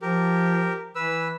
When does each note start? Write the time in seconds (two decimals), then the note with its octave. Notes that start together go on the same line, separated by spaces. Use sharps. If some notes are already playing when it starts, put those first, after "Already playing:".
0.02 F3 G4 A#4
0.95 E3 B4 E6